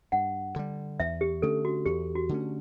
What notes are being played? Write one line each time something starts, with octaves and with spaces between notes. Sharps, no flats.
G2 F#5
D3 G3
E2 E5
G4
D3 A3 C#4 A4
F#4
E2 G4
F#4
D3 A3 C#4